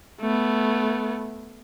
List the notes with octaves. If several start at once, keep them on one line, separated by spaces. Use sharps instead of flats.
A3 B3